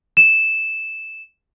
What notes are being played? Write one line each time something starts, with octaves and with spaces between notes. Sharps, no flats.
E7